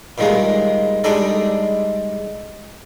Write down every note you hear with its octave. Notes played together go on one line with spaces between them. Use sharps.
A#2 D#3 G3 G#3 A#3
G3 G#3 D4 D#4 A4 D5